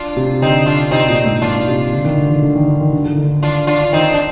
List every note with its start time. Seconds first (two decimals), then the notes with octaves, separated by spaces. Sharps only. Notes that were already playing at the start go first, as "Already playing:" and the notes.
Already playing: D4 F4
0.16 C3
0.42 D3 C4 D#4
0.66 D4 F4
0.91 C3 C4 D#4
1.08 A#2
1.25 G#2
1.41 A#2 D4 F4
1.67 C3
1.93 D3
2.05 D#3
2.18 D3
2.30 D#3
2.42 D3
2.55 D#3
2.68 D3
2.81 D#3
2.93 D3
3.06 D#3
3.18 D3
3.43 D4 F4
3.67 D4 F4
3.93 D#3 C4 D#4
4.14 D4